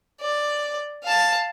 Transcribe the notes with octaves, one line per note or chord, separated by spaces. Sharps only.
D5
F5 A5